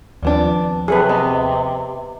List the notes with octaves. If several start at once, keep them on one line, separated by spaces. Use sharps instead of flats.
D#2 F3 G3 B3 C4 D4
C3 F#3 G#4 A4 B4
B3 D#5